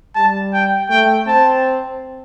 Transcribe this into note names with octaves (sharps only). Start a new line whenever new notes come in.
G3 A5
G5
A3 G5
C4 A5